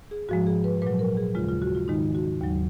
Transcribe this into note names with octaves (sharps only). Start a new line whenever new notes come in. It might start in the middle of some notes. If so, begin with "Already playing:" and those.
G#4
G#2 F3 G#3 F#4
G#4
B4
A#2 F#3 B4
A#4
G#4
D#2 C#3 G#3 F4
F4
F#4
F4
G#2 D#3 G#3 D#4
F#4
D#2 C#3 F#3